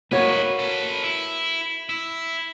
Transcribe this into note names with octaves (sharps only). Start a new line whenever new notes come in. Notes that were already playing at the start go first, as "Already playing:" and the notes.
A#3 D#4 F#4 B4 C#5
A4 B4
E4
E4